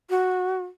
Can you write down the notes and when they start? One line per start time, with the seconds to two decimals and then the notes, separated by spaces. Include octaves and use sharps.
0.10 F#4